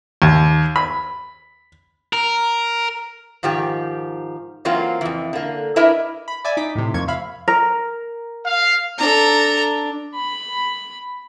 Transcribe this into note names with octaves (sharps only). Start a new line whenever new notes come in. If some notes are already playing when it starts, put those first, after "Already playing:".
D#2
B5
A#4
G#2 D#3 F3 G4
E3 F#3 A#3 C4 F4
F2 E3
D3 A#3
D4 E4 A#4 B4 D#5 E5
B5
D5 E5 G#5
D#4 D6 B6
A2 C3
F2 A#3 C#6 G#6
E5 F5 B5
A#4
F5
D4 A4 A#5
B5